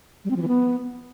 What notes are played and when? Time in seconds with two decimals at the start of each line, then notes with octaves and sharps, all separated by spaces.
0.25 G3
0.30 C4
0.36 F3
0.42 E3
0.48 B3